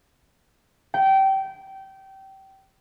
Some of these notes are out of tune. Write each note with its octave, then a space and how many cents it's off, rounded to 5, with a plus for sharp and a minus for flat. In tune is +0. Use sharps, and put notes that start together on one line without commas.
G5 -20